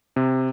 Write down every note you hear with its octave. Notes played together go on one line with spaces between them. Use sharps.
C3